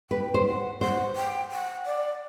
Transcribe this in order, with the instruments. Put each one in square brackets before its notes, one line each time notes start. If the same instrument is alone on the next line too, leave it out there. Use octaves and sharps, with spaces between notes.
[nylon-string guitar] B4 [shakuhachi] G5
[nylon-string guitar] C5
[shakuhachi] F#5
[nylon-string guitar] C5 [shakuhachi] F#5
[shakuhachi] G5
F#5
D5